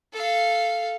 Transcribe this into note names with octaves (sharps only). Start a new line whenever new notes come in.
A4 F5